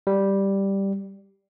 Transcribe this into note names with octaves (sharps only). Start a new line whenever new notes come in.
G3